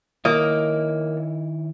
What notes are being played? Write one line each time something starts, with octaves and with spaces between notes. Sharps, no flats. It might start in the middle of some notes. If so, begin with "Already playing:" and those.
D#3 A#3 E4 C#5 D#5